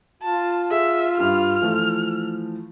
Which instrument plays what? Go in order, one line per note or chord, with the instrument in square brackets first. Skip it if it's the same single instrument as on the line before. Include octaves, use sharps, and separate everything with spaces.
[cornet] F4 [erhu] A5
[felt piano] G#4 [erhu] E5
[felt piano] G2 G4 [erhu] F6
[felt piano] E3 F3 A3